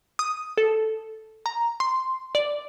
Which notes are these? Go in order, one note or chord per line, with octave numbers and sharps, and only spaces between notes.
D#6
A4
A#5
C6
D5